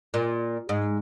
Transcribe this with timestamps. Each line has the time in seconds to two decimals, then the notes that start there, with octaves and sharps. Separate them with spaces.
0.14 A#2
0.69 G#2